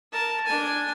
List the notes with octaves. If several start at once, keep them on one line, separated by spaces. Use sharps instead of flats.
A#4 A5
D4 G#5